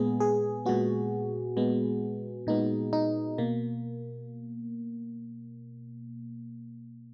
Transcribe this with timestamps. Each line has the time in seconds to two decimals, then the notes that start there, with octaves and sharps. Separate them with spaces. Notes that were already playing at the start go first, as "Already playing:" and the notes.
Already playing: A#2 G#3 B3 G#4
0.20 G#4
0.66 A#2 G#3 B3 F#4
1.57 A#2 G#3 B3
2.47 A#2 G#3 B3 D#4
2.93 D#4
3.38 B2 A#3